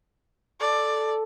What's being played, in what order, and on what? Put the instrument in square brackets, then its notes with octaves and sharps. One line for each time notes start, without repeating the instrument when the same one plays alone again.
[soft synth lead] A4 [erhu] D5